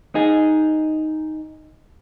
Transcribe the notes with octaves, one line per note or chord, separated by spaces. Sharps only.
D#4 G#4